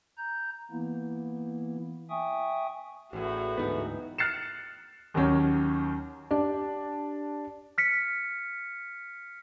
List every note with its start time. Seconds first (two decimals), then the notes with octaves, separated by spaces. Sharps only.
0.18 A#5 G6
0.71 E3 A#3 B3 E4
2.10 E5 G5 G#5 C#6 D#6
3.13 A1 E2 A2 F#4
3.58 D2 G#2 E3 B3 D#4
4.18 F6 F#6 A6 C7 C#7 E7
5.14 D#2 D#3 F#3 C#4
6.31 D4 G4 D5
7.78 F6 B6 C#7